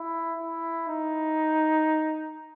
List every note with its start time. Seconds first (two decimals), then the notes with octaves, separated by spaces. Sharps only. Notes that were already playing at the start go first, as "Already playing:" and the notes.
Already playing: E4
0.37 E4
0.89 D#4